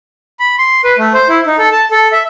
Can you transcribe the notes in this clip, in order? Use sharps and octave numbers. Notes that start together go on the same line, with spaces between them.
B5
C6
B4
A3
C5
E4
D#4
A4
A5
A4
E5